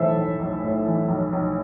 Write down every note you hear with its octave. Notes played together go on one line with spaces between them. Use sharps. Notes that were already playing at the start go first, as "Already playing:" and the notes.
Already playing: B1 A2 E3 A4 C5 E5
B1
B1
A2
E3
B1
B1